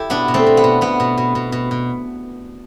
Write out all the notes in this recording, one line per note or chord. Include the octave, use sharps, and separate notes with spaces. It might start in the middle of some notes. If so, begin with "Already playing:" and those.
Already playing: E4 G4 A4
B2 B3 D4
B2
A3 C4
B2
B3
B2
B2 B3
B2
B2
B2
B2
B2